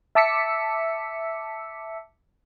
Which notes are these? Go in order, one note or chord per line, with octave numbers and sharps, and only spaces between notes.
E5 A5 D6 E6 B6 C#7